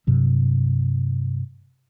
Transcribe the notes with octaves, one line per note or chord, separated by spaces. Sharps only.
G2 C3 F#3